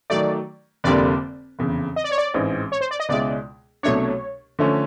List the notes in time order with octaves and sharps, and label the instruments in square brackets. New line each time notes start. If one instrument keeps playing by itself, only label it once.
[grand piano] D#3 F#3 A3 [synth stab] D5
[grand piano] F1 F2 D3 G3 A#3 [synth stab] D5
[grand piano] F1 E2 C#3
[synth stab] D#5
D5
C#5
D5
[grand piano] A1 G#2 E3 G#3 C4
[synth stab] C#5
C5
D5
D#5
[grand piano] C#2 B2 G#3 C#4 E4 [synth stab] D5
[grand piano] C2 B2 F#3 A3 D4 [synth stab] C#5
[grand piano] D3 F3 A3 C#4